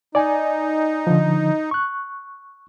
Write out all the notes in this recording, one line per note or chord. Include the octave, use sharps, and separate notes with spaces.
D#4 D5 G#5
D3 F3
C#6 F#6